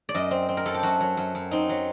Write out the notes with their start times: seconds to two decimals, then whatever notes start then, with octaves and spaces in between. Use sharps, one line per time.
0.09 D5
0.15 F#2 D#5
0.31 C4
0.49 C4
0.57 A#4
0.66 F#2 A4
0.75 G4
0.83 F#2 F#4
1.01 F#3
1.17 F#2
1.35 F#2
1.51 C4 D#4
1.69 F#3